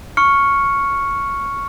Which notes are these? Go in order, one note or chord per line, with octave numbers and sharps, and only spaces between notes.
C#6 F6 C#7